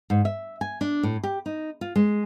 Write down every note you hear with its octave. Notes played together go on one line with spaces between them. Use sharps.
G#2
E5
G#5
D4
A2
G4
D#4
F4
G#3